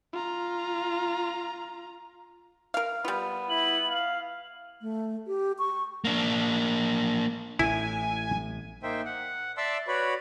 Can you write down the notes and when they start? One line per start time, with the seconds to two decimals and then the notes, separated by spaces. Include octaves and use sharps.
0.14 F4 A#5
2.74 A#4 F5
3.05 G3 B3 F4
3.50 E4 F#7
3.88 F5
4.81 A3
5.27 G4
5.59 C#6
6.05 A#3 D4
7.59 A1 A2 E4 G#5
8.83 A#3 D#4 C5 E5 G5
9.05 F#5
9.57 D5 E5 A5 C6 D6 E6
9.88 F#4 B4 C#5 D5 B5